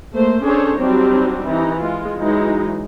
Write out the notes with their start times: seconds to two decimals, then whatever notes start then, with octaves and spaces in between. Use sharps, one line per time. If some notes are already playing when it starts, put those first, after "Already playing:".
0.14 A3 A#3 C5
0.44 C#4 D4 G#4 A4 C5 C#5
0.78 F#3 G3 C4 D4 D#4 G4
1.47 E3 D#4
1.81 G#3 F4
2.20 E3 F#3 G#3 D#4